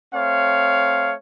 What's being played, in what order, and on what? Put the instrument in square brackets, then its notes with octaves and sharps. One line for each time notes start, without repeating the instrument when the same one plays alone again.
[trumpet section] A3 C4 C#5 F5